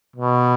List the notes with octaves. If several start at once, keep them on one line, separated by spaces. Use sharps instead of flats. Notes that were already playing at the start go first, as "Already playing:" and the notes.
B2